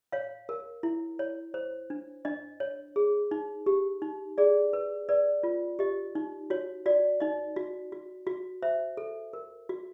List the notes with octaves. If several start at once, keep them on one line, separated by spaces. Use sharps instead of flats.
C#5 F5
A#4
E4
C#5
C5
D4
D4 D#5
C#5
G#4
D#4
G4
D#4
G#4 D5
B4
B4 D5
F4
G4 D#5
D#4
F#4 C#5
F#4 D5
D#4 D#5
F#4
F#4
F#4
C5 E5
A4
A#4
F#4